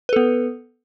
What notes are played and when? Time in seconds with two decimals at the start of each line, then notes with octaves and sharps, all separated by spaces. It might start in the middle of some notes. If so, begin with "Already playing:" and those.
0.09 B4
0.13 A4
0.16 B3